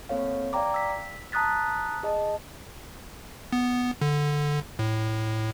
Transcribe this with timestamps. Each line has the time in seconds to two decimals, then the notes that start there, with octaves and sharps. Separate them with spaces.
0.09 A#3 C4 A4 C#5 F5
0.53 D5 F5 G5 A#5 D6
0.74 E6 B6
1.32 A5 A#5 D#6 F#6 A6 B6
2.03 G#4 D#5 A5
3.53 B3
4.01 D3
4.79 A2